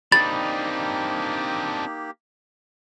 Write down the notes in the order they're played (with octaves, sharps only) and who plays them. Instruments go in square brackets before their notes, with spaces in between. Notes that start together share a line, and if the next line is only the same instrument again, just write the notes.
[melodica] A#3 G4 [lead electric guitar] C4 D4 [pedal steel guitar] D#4 B5 [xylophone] A6